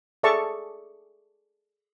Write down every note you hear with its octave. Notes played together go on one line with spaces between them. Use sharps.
G#4 A4 D5 E5 A5 C#6